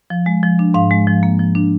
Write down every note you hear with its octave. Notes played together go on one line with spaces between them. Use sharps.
F3
G#3
F3
D4
G#2 F5
G#3
F3
A#3
F3
D4